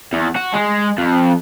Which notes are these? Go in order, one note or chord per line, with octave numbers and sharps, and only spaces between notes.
E2
F#4
G#3
F2